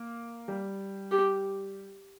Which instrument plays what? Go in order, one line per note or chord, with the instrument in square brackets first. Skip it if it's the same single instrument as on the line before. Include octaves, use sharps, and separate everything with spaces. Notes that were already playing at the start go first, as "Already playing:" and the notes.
Already playing: [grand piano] A#3
G3
[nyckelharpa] G4